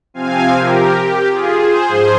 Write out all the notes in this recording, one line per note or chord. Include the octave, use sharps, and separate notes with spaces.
C3 F3 C4 F5 G#5
G4 A#4
G4
F4 G#4
G#4 C5
G#2 F3 G#4 C5